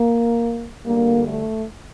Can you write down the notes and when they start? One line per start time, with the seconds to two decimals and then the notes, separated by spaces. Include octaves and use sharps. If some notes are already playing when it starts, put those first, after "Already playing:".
Already playing: A#3
0.85 D2 D3 G3 A#3
1.26 A3